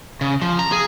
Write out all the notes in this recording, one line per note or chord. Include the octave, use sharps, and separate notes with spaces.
C#3
F3
A#5
G#4